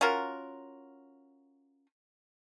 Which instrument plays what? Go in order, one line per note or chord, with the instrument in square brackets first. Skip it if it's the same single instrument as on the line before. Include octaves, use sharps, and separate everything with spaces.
[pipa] C#4 F4 F#4 A#4